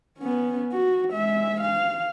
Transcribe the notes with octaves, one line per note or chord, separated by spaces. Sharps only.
B3 C#4
F#4
G#3 E5
F5